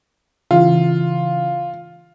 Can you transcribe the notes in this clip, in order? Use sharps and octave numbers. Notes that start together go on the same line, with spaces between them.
C#3 E3 F4